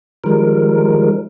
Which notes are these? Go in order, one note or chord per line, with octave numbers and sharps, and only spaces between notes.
D#3 F3 G3 G#3 A#4